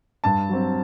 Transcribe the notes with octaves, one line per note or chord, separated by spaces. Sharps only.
G2 A5
F#3 C4